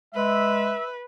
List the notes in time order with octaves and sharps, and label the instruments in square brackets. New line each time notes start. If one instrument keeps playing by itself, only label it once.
[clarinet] G#3 [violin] B4 [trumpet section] E5